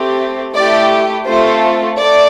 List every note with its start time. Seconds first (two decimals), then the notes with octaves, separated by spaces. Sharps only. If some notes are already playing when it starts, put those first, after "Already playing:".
Already playing: A3 C4 G4
0.55 A3 E4 G4 D5
1.27 A3 C4 F4 A4 C5
1.99 A3 D5